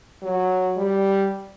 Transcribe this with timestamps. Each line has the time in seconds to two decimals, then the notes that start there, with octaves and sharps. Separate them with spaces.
0.23 F#3
0.77 G3